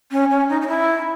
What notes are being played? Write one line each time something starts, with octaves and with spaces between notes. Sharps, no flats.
C#4
C#4
D#4
D#4
E4